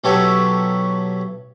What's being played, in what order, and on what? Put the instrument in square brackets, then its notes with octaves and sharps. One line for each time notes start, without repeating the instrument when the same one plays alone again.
[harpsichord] B1 F#3 G4 A4 C#5 E5